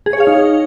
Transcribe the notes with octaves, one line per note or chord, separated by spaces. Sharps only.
G#4
C#5
F5
D#4